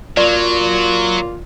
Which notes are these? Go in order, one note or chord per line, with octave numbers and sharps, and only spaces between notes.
A#2 F#3 A#3 F4 D5